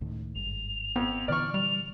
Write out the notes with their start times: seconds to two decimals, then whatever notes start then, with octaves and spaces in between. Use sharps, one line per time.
0.01 C#2 A2 D#3
0.35 G#1 G2 F7
0.96 F2 B3
1.28 A#2 D3 E3 D5 C#6 F6
1.54 G3 F7